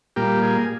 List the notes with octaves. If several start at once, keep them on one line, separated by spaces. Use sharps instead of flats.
A#2 G3 A#3 G4
G#4